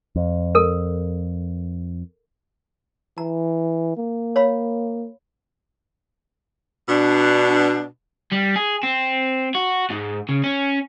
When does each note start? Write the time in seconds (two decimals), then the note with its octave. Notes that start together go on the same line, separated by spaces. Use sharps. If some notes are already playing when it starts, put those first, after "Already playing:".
0.16 F2
0.55 A4 A#4
3.18 E3 A#5
3.97 A#3
4.36 C#5 F5 B5
6.89 B2 D4
8.32 G3
8.56 G#4
8.83 C4
9.55 F#4
9.90 G#2
10.29 C#3
10.44 C#4